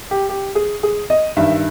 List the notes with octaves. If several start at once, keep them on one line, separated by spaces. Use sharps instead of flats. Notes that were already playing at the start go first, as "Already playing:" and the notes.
G4
G4
G#4
G#4
D#5
G2 D#3 E5